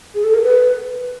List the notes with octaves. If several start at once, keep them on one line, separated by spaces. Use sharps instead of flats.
G#4
A4
A#4
B4